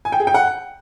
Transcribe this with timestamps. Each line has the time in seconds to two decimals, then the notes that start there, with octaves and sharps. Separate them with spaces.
0.05 G#5
0.12 G5
0.20 G#4
0.27 G5
0.34 F#5